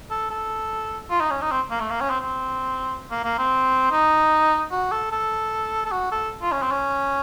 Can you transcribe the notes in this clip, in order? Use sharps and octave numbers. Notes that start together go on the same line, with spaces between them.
A4
A4
F4
D#4
C#4
D#4
C4
A#3
A3
A#3
C#4
C4
C4
A#3
A#3
C4
D#4
F#4
A4
A4
A4
F#4
A4
F4
C#4
C4
C#4